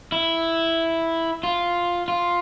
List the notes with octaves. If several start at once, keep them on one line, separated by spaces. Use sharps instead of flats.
E4
F4
F4